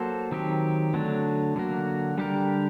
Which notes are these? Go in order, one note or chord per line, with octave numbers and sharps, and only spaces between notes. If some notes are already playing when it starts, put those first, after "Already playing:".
Already playing: F#3 A#3 F#4 A4 C5
D#3 F#3 C4 G4
D3 F#3 A3 D4
D3 F#3 A#3 F#4
D3 G3 D4 G4 A#4